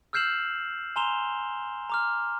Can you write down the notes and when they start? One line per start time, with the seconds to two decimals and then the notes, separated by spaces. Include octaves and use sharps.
0.13 E6 F6 G6 C7 E7 F#7
0.96 G#5 A#5 C6 E7 F7 G7
1.90 A#5 D6 F6